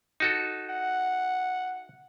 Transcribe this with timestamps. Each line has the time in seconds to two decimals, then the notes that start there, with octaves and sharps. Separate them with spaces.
0.20 D#4 F#4 A4
0.69 F#5